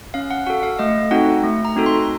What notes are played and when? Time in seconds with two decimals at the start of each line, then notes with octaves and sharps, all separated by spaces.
0.14 C#4 F5
0.30 F#5
0.46 F#4 A4 F#5
0.63 F5
0.79 A3 D#5
1.11 C4 D#4 F#4 A4 F#5
1.44 A3
1.65 A#5
1.76 C4 D#4 F#4 A4
1.86 C6